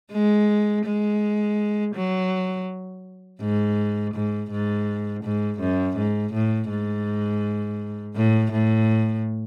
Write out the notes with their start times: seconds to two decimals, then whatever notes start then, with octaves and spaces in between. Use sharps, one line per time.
0.13 G#3
0.86 G#3
1.95 F#3
3.41 G#2
4.15 G#2
4.51 G#2
5.24 G#2
5.60 F#2
5.97 G#2
6.34 A2
6.70 G#2
8.16 A2
8.52 A2